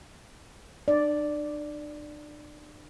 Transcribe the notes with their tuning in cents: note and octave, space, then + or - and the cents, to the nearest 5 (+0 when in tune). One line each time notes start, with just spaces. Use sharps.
D4 +40 D5 +0